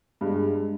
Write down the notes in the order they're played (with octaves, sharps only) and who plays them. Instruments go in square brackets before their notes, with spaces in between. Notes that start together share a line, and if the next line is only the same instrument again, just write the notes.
[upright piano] G2 [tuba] G#3